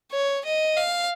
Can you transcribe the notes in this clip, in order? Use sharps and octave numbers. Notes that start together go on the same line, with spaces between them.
C#5
D#5
F5